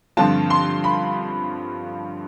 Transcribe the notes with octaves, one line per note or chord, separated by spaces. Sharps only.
G2 D3 F3 C4 F4 A5
C6
B5